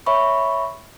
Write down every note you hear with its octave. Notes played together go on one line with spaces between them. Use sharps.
C#5 E5 B5 C#6